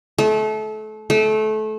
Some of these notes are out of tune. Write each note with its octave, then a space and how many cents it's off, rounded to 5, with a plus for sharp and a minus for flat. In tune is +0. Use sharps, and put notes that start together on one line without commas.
A3 -30
A3 -25